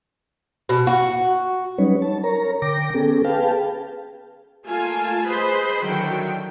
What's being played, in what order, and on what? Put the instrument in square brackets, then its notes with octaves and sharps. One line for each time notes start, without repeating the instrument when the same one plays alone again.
[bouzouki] B2
F#4
[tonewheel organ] F#3 G3 C#4 D#4 B4 C#5
A5
A#4 C#5 A#5
D3 G5 D6 A#6
B3 C#4 G#4 A4
G#4 B4 F5 G5 A5
[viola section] A3 A#3 F4 G#5 A5
G#4 B4 C5 D#5 B5 C6
D3 D#3 F#3 E4 F#4 G5